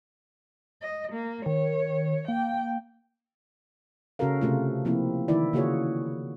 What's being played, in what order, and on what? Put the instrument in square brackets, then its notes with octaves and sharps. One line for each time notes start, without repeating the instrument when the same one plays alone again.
[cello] D#5
A#3
[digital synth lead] D#3 [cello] C#5
[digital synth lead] A#3 [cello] G5
[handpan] C#3 C#4 F#4 A4 A#4 F5
C3 A3 F4
F3 A#3 C4 E4
D#3 E3 E4 D5
C#3 A#3 F4 F#4 G#4 C#5